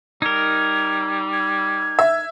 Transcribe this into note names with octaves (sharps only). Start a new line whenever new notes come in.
G3 D#4 A#4 G#6
G#6
E5